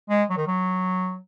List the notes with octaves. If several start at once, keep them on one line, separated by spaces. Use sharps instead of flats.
G#3
F#3
D#3
F#3